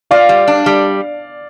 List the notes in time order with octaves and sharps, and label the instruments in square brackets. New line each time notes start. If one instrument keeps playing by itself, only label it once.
[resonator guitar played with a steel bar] F4 [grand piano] D5 F5
[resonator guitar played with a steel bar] G3
D4
G3